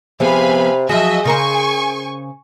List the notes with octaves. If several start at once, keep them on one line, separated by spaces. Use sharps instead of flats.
C3 F3 B3 G#4 F5 G#5 B5
F3 F#3 F#4 G#4 D#5 E5
C#3 A#4 C5 G#5 C#6